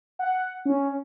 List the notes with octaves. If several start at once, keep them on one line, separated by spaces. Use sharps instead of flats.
F#5
C#4